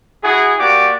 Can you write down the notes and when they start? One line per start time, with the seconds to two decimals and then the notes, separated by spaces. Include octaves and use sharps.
0.23 E4 F#4 G#4
0.59 A#3 F#4 G4 D5 D6